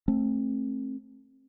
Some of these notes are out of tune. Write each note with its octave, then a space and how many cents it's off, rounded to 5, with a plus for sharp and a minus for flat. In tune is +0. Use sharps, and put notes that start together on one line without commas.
A3 +0 C4 +30